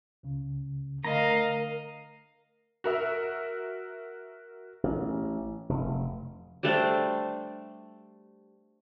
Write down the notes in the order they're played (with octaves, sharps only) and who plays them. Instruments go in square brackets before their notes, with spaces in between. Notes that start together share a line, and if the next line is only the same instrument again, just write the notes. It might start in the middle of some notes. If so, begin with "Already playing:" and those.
[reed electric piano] C#2 C#3
[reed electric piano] D3 A3 [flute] A#4 [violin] D#5 F5 [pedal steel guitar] A#5
[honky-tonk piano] F#4 A#4 E5
[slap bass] A1
F1
[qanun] G3 A3 D4 C5